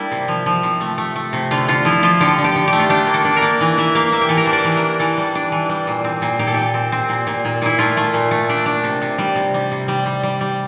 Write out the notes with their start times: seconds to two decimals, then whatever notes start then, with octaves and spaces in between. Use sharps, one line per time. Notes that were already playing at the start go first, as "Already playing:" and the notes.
Already playing: G3 A#3 D4 E4
0.11 C3
0.28 F3
0.46 F3
0.63 C3
0.80 A3
0.98 A3
1.16 A3
1.33 C3
1.51 D3 F4
1.68 D3 F4
1.85 F3 E4
2.03 F3 F4
2.20 D3 G4
2.38 D3
2.44 G4
2.56 D3
2.68 G4
2.73 A3
2.79 F4
2.89 D4 G4
3.07 A#3
3.14 A4
3.25 D4
3.37 A#4
3.42 A#3
3.61 E3
3.78 E3 E5
3.95 A#3 F5
4.12 A#3 E5
4.22 G4
4.29 E3 A4
4.37 A#4
4.45 D4 C5
4.53 D5
4.64 E3
4.77 A#4
4.82 D4
5.00 E3 A4
5.18 G3
5.35 D4
5.52 E3
5.69 G3
5.87 A#2
6.05 C4
6.22 A#2
6.39 A#2 G4
6.47 A4
6.54 A#2 G4
6.74 C4
6.92 C4
7.09 A#2
7.27 A#2
7.45 A#2
7.62 A#2 E4
7.79 A3 F4
7.97 A3
8.14 A#2
8.31 A3
8.49 D4
8.66 D4
8.84 C3
9.02 C3
9.18 G3
9.36 C3
9.54 G3
9.72 C3
9.88 G3
10.06 G3
10.23 G3
10.41 G3